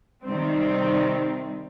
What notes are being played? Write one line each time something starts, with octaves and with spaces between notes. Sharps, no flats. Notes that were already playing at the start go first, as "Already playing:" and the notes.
C3 D#3 G3 C4